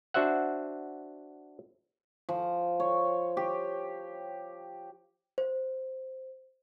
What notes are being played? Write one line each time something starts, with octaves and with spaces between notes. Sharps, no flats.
D4 F#4 C5 E5 F#5
F3
C#5
G4
C5